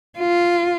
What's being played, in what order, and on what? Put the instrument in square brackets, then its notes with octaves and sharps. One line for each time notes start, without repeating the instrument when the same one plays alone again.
[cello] F4